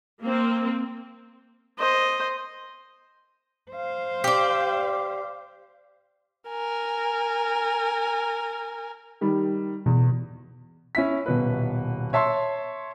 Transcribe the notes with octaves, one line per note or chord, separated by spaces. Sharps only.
A#3 C4
C5 D#5
C5 F5
G4 D5
A#4 G#5
D#3 G3
E2 B2
C#4 E4 B6
D#1 B2 B4
C#5 E5 A5 C6